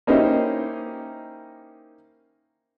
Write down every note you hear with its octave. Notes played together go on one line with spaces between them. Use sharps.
A#3 C#4 D#4 E4 G4 C5